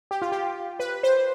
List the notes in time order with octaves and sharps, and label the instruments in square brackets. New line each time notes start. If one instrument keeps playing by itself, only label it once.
[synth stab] G4
F4
G4
B4
C5